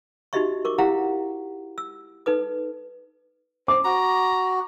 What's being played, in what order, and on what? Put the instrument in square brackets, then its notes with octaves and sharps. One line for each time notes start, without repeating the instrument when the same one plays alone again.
[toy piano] D#4 F#4 G4 D#5 E5 C#6
A#4 C#6 D6
E4 G4 F5 F#5 A#5
E6
D#4 A4 B4 D#6
[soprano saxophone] C5 [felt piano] D6
[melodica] F#4 [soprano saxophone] A#5